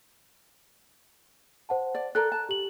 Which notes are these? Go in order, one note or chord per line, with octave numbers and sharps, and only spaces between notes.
C5 F#5 A5
D5
A4 A#4 D5 A#5 F#6
A5
G4 F#7